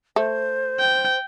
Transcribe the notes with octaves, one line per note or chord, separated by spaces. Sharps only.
A3 C5
G5